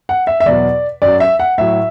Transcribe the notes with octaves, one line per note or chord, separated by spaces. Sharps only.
F#5
E5
E5
E2 B2 F#3 D5
F#2 F#3 D5
E5
F#5
A2 F#3 E5